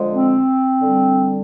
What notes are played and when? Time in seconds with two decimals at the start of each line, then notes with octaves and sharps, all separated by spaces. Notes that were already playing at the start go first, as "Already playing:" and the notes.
Already playing: D3 F3 G#3
0.12 C4
0.81 D3 G3